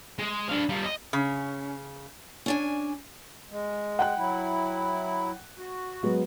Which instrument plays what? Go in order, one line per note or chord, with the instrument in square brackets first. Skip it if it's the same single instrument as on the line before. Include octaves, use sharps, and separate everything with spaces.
[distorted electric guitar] G#3
D4 F5
G3 F4
D#5
[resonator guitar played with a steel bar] C#3 [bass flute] C#4
[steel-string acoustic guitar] C#4 D4 G#5
[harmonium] G#3
[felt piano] F#5 G5 F#6
[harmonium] F#3 E4
F#4
[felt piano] F#3 G#3 B3